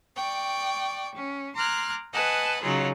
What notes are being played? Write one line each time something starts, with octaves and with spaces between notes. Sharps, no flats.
D5 G5 C#6
C#4
A#5 C6 D6 F6 F#6 G#6
B4 D#5 F#5 G#5 A5
C#3 F#3 D#4 F4 G#4